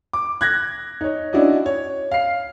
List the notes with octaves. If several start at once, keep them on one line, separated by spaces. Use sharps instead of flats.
D6
F#6 G#6 A#6
D#4 C#5
C#4 D4 E4 F#4 D5 D#5
C#5
F5 C7